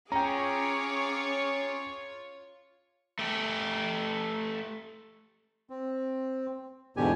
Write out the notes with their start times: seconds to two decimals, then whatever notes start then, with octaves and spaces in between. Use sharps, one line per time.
0.12 C#4 F4 G#4 C#5 G5 A#5 D6
3.19 A3 G4
5.70 C4
6.97 E2 G#2 B2 D3 G4 G#5